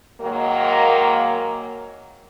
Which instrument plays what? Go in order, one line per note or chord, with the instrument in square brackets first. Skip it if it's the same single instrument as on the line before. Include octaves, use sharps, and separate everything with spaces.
[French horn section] G#2 D#3 F#3 A#3